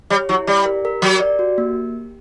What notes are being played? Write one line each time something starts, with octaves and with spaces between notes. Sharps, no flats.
G3 C#5
F#3 E4
G3 D5
A#4
A#4
F#3 A#4
D5
F#4
A#3